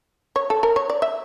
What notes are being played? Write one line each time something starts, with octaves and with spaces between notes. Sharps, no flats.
C#5
A4
A#4
C#5
D5
E5